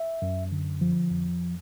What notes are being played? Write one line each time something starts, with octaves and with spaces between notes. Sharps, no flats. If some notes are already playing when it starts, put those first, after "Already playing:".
Already playing: E5
F#2
D3
F3
F2